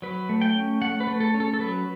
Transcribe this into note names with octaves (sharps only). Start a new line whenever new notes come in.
F#3 B4
A3
G5
C#4
A3 F#5
B4
A3
A4
C#4
A4
A4
F#3 B4